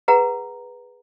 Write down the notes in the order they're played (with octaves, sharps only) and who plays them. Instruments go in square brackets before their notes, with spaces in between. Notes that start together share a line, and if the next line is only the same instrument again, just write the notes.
[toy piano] G#4 B4 F#5 A#5